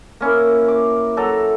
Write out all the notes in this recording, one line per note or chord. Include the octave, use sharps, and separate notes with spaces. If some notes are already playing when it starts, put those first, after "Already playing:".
A#3 C#4 E4
D6
F#3 A4 E5 A#5